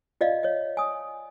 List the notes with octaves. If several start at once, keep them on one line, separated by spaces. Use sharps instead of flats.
F4 D5 D#5 F5
C#5 D#5
G#5 D#6